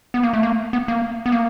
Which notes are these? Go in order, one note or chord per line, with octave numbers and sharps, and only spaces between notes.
B3
A#3
A3
A#3
B3
A#3
B3
A#3